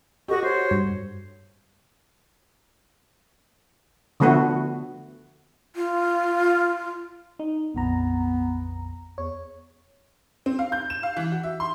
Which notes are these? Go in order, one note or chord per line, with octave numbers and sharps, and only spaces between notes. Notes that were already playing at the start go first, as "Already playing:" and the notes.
F#4 G4 A4 D#5 C#6
F#4 C5 C#5
G2
D3 F3 A3 B3 F#4
F4
D#4
A#1 F2 B3 A#5
E2 C#5
C4
F5
G6
E7
F5
E3
F#4
E5
C6